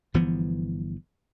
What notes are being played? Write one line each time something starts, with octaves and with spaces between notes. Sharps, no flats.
G1 E3 F3 B3